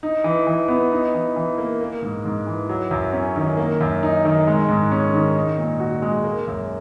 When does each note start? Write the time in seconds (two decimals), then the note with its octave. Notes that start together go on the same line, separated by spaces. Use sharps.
0.03 D#4
0.24 E3
0.47 E3
0.68 B3
0.92 D#4
1.14 E3
1.36 E3
1.58 A#3
1.81 A#3
2.02 G#2
2.25 G#2
2.47 E3
2.69 F#3
2.91 F#2
3.13 C#4
3.36 D#3
3.57 A#3
3.81 F#2
4.03 D#4
4.25 D#3
4.47 G#3
4.68 G#2
4.91 C#4
5.14 D#3
5.35 D#4
5.58 A#2
5.80 F#4
6.02 G#3
6.24 A#3
6.47 F#2